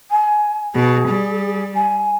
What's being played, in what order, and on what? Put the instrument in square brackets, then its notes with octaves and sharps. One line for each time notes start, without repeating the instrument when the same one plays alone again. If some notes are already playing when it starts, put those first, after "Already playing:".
[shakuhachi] G#5
[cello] B2 [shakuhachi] G#4
[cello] G3
[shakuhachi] G#5